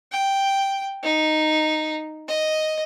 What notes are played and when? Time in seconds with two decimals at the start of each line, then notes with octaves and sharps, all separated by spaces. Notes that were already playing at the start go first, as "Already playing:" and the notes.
0.12 G5
1.03 D#4
2.28 D#5